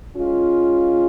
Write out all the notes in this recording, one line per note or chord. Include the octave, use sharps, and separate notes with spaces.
G#3 C#4 F4